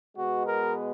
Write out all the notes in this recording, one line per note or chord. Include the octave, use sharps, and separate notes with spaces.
B2 G#3 B3 F#4
A#4